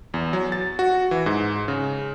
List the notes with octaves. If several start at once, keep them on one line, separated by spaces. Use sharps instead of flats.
E2
F#3
A6
F#4
E3
G#2
C#3